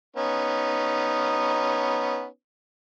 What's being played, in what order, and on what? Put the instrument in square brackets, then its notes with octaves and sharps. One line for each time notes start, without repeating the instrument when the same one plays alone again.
[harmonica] B3 C#4 D#4